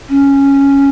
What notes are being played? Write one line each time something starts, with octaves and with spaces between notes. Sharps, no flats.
C#4